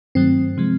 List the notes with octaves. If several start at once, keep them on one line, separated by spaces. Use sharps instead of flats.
G2 D#3 F#3 A3 C4
C3 F3 G#3